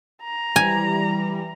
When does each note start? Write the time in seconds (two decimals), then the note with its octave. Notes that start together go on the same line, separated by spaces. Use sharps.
0.23 A#5
0.56 E3 G3 G#5